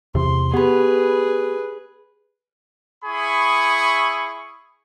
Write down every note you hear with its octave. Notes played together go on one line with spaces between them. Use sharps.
E2 C3 C6
B3 G4 G#4 B4 B5
E4 G#4 B5 C#6 D#6